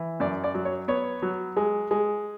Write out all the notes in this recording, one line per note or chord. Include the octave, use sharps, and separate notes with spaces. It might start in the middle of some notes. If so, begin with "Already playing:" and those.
Already playing: E3
F#2 D5
D5
F#3
C#5
B3 C#5
F#3
G#3
G#3